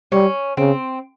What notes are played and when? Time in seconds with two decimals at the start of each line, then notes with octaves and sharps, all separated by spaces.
0.12 G3 C#4
0.57 C#3 C4